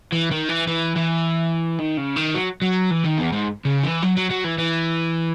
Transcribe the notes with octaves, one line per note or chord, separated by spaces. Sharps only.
E3
D#3
E3
E3
E3
D#3
C#3
D#3
F#3
F#3
E3
D#3
E2
G#2
C#3
E3
F#3
F#3
F#3
E3
E3